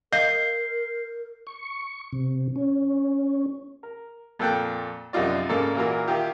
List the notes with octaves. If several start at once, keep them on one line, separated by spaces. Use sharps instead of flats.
A#4 D#5 F5 G6 C7
C#6
C3
C#4
A#4
F2 A#2 A4 G5 F#6
A#1 F#2 C3 D#4 F4 D5
G#2 C#3 A#3 A4 A#4 D5
A#2 E3 F4 F#4 A#4
D#3 E4 F4 G4